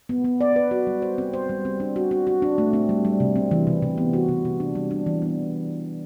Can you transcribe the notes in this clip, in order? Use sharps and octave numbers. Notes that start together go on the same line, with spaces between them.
B3
B3
D5
B4
F#4
G3
C5
C4
C5
G3
C4
D4
F#4
F#4
F#4
D4
A3
C4
G3
G3
C3
C4
E3
C3
C3
B3
F#4
C3
C3
D4
G3
D4
E3
B3